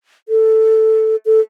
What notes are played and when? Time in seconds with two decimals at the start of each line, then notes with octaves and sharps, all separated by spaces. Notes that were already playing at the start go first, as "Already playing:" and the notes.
0.29 A4
1.26 A4